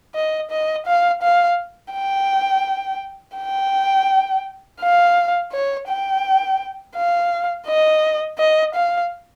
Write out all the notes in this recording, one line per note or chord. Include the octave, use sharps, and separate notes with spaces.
D#5
D#5
F5
F5
G5
G5
F5
C#5
G5
F5
D#5
D#5
F5